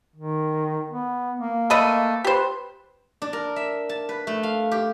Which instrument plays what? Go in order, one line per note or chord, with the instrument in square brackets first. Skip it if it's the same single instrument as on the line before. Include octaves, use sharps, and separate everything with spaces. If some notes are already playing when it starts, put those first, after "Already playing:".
[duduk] D#3
B3
A#3
[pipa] A3 B4 D#5
[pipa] G4 C5 [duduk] B4
[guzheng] D4
A#4
E5
A5
B4
A3
F5
G4